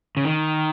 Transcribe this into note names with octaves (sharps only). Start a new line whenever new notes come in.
C#3
D#3